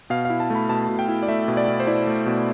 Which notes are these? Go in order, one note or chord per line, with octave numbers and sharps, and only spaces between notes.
B2 F5
E4 F5
A5
A3
B5
B2 A5
B2
G5
E4
D5
A3 E5
B2
D5
B2
C5
E4 D5
A3
B2